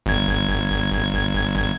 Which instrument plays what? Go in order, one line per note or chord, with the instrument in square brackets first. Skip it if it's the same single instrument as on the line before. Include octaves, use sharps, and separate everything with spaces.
[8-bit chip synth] G1 G#6